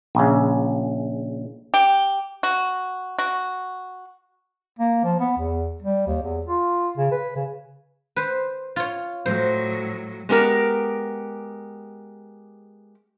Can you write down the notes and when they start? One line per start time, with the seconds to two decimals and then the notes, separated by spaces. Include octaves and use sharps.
0.15 A#1 C#3
1.74 G4
2.43 F#4
3.19 F#4
4.79 A#3
5.04 F3
5.20 B3
5.38 E2
5.82 G3
6.06 D#2
6.23 E2
6.47 F4
6.97 C#3
7.12 B4
7.35 C#3
8.16 B4 C5
8.76 F4 C#5
9.26 A2 F#3 C5
10.29 G#3 B3 G4 A#4